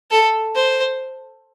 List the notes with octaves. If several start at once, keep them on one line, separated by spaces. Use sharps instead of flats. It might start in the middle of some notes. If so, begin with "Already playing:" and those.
A4
C5